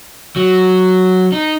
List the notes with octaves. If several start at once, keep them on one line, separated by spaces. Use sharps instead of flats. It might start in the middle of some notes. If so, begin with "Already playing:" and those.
F#3
D#4